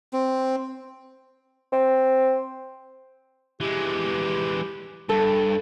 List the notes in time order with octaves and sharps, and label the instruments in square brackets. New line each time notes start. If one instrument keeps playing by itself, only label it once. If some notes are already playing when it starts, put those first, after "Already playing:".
[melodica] C4
[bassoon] C4
[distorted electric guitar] E3 G#3 [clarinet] G4
[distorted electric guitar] G2 [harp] A4